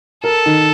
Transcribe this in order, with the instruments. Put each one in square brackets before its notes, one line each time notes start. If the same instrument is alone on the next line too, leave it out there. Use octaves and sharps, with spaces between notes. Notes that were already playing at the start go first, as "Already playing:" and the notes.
[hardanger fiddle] A4 [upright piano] A#4
[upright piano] D#3